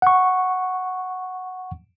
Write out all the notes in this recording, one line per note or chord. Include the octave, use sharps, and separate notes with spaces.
F#5 C#6